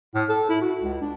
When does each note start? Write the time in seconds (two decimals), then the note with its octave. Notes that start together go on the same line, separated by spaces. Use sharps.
0.14 A2
0.29 A4
0.49 E4
0.62 F#4
0.82 C#2
1.01 D4